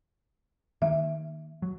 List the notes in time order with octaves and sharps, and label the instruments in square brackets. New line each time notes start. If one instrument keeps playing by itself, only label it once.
[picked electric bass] D#3 A#3 [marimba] E5
[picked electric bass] F#3